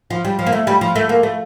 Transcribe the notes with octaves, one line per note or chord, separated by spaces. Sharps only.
F3
G3
F3
A#3
A3
G3
F3
A3
A#3
A3